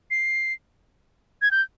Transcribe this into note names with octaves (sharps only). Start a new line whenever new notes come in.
C7
G#6
G6